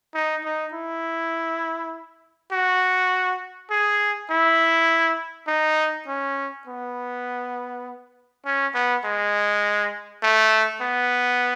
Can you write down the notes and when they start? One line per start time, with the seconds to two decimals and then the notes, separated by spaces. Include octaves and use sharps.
0.15 D#4
0.45 D#4
0.74 E4
2.52 F#4
3.71 G#4
4.30 E4
5.48 D#4
6.07 C#4
6.67 B3
8.45 C#4
8.74 B3
9.05 G#3
10.23 A3
10.81 B3